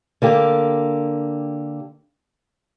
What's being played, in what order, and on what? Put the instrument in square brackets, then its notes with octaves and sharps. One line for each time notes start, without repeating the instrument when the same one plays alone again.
[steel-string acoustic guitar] D3 A#3 G4